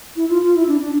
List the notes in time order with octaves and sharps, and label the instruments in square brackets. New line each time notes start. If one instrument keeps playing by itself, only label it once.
[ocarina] E4
F4
F4
E4
D4
D4